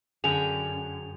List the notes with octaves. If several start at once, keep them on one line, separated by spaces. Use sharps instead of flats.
F#2 D3 C#4 G#4 G5 F7